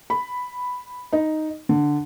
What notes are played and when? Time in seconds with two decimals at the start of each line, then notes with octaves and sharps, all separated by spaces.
0.10 B5
1.13 D#4
1.69 D3